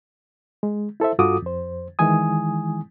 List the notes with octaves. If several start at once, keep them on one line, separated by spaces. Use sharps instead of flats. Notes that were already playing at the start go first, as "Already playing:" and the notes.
G#3
E4 A4 C5 E5
G2 F4 F#4 A4 D6 D#6
F2 C5
D#3 E3 G#3 E4 G#5 D#6